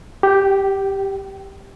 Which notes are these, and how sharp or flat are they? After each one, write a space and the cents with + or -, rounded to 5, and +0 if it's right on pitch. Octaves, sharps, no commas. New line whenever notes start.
G4 +0 G5 -30